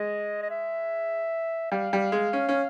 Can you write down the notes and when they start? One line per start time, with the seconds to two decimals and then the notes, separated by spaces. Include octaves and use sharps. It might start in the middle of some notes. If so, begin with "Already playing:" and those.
Already playing: G#3 D#5
0.42 D#5
0.50 E5
1.72 G3 F5
1.93 G3
2.12 G#3
2.33 C#4
2.49 C#4